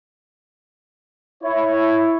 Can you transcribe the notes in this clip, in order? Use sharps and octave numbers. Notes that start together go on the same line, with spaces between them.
E4 C#5